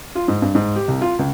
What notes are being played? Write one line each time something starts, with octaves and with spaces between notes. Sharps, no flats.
F4
G#2
G2
G#2
G4
C2
F4
C#2